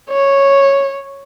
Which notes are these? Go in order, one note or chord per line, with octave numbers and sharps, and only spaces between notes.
C#5